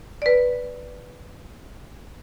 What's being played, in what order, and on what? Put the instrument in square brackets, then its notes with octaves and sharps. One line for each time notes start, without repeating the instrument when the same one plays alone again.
[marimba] B4 D5